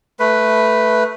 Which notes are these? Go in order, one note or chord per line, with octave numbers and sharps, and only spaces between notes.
A3 B4